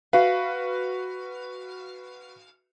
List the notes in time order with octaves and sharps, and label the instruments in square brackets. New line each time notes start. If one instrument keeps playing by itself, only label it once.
[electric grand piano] F#4 B4 [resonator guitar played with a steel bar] F5